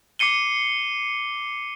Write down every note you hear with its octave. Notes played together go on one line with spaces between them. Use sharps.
D6 C7 C#7 D#7 G7